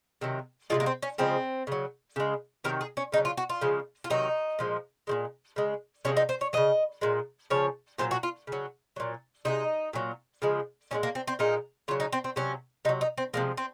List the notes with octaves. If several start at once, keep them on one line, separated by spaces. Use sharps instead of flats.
C3 D#3 F#3
C3 D#3 G#3 F4
A#3
C4
C#4
C#3 F3 G#3 C4
C#3 F#3
C#3 G#3
C3 D#3 F#3 A#4
G#4
C#4
C#3 D#4
F#3
F4
F#4
F4
C#3 F3 G#3
F4
C3 D#3 F#3 D#4
A#2 F3 G#3
A#2 F3 G#3
C#3 G#3
C3 F3 G#3 C#4
D#4
C5
C#5
C#3 F#3 D#5
A#2 G#3
C#3 F3 C#5
A#2 F#3 C5
F#4
F4
C#3 F#3
A#2 F#3
C3 D#3 G#3 D#4
A#2 F#3
C#3 F3 G#3
A#2 F3 G#3 C#4
A#3
C4
C4
A#2 F3 G#3 D#4
C#3 F#3 F4
D#4
C4
C4
C3 F#3 C#4
C3 F#3 D#4
D#4
C4
C3 F3 G#3 A#3
C4